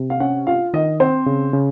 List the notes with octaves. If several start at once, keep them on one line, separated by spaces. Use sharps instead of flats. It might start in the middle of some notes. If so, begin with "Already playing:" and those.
Already playing: C3
F5
C#4 F#5
F4 F5
D#3 D#5
C4 C5
C#3
C#3